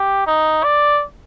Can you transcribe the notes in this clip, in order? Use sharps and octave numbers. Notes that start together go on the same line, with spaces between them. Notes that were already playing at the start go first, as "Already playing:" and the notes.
Already playing: G4
D#4
D5